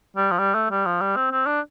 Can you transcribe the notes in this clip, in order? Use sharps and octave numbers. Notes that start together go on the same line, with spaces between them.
G3
F3
G3
A3
G3
F3
G3
C4
C4
D4